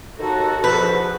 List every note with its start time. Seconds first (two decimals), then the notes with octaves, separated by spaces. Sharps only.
0.18 D#2 D#4 F#4 A4
0.64 E2 G#2 F3 B4